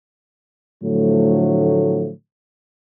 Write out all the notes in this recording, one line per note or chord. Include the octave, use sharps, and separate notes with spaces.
A2 D3 F3 F#3 A3